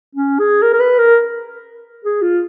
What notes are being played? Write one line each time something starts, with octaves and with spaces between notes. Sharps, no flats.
C#4
G#4
A#4
A#4
B4
A#4
G#4
F4